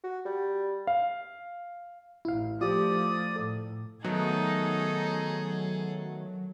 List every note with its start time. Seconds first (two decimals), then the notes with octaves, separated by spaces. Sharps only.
0.04 F#4
0.25 G3
0.87 F5
2.25 A1 E4 F5
2.61 F3 A3 F4 G4 D5 D#6
3.36 A2 A4
4.04 D#3 F#3 A3 B3 D#4 G#4 A4